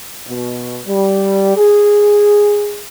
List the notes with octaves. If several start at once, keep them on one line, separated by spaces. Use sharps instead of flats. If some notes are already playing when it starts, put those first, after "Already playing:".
B2
G3
G#4